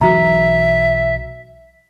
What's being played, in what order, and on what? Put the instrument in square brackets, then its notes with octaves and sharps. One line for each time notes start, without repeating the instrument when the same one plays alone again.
[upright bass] B1 [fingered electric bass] B2 E3 F#3 [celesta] F#4 A#5 [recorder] E5